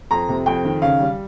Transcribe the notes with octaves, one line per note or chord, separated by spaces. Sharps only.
F2 A#5
C3
F2 G5
D#3
C#3 F5
G3